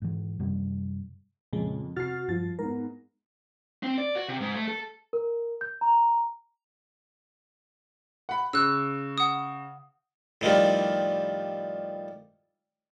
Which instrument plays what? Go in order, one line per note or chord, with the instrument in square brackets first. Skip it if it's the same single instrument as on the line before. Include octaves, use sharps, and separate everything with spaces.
[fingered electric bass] G#2 E3
F#2 C3 G3
[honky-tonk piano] F2 [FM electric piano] A#2 C#3 G#3
[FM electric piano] C3 F6 A6 [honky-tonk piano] F#4 C7
[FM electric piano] G2 A6 [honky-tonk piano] F3
[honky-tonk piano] G#2 B3 [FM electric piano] A#4
[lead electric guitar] C4
D5
F#4
C3
G#2
A3
A4
[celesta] A#4
G6
A#5
[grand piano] F#5 B5
[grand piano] C#3 [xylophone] E6 F#6
[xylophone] F#5 D#6
[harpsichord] A2 D#3 F3 G3